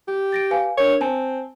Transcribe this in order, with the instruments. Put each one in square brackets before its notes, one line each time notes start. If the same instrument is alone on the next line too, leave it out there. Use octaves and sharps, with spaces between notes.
[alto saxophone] G4
[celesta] A6 A#6 D7
B4 F5 G#5
[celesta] D4 A#4 [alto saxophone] C#5
[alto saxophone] C4 [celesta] G#5 A5